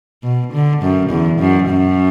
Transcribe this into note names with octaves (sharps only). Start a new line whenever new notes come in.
B2
D3
F#2
E2
F#2
F#2